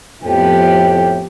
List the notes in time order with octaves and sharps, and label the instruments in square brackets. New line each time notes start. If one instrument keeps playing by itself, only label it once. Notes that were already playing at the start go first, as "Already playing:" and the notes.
[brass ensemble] F2 A2 G5 [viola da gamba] F3 B3 G4